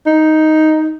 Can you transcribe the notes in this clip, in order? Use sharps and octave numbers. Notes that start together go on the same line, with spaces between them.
D#4